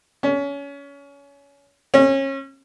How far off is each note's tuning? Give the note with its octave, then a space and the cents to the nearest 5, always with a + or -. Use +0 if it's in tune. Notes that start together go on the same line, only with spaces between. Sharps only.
C#4 +25
C#4 -30